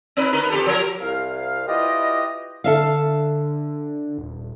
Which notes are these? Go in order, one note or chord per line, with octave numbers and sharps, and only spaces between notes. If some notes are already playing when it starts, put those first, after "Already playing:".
C4 D#4 B4
D#3 A#4 B4
F2 G4 A4
F3 A#4
C2 F5
E4 F4 G4 B4 D5 D#5
D3 A4 E5 F5
D#1